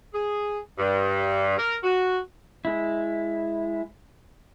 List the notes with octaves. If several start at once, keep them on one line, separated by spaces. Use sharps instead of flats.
G#4
G2
A#4
F#4
G#3 E4